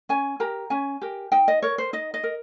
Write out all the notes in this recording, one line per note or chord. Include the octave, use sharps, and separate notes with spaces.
C#4 G#5
G4 A#4 A#5
C#4 G#5
G4 A#4
D#4 G5
D#5
A#4 C#5
C5
D#4 D#5
D#5
A#4